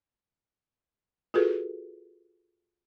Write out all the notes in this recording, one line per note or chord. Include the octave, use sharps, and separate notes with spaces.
F4 F#4 G#4 A4 B4